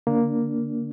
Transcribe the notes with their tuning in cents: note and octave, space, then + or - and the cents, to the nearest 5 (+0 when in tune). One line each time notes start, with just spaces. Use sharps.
D3 -20 A#3 +0 D4 -10